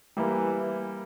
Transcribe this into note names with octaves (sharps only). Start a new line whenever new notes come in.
E3 G3 A#3